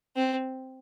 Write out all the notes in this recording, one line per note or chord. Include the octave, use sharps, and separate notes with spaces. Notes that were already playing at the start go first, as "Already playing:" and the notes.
C4